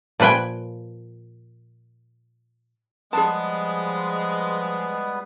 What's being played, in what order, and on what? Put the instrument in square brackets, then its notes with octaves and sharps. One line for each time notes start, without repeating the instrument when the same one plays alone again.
[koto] A#2 F3 B4 G5 G#5
[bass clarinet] F3 [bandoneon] G3 B3 B4 [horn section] G#3 [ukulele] G#4 A5